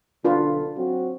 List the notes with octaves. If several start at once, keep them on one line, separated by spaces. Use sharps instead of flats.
B1 D3 D4 F4 B4
F#3 C4 F#4